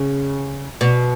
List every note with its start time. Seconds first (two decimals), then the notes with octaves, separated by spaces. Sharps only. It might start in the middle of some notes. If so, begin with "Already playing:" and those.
Already playing: C#3
0.81 B2